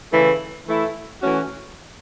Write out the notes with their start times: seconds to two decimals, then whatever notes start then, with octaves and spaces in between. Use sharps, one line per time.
0.13 C#3 E3 A3 E4
0.67 E3 A3 E4
1.21 E3 A3 C#4 F#4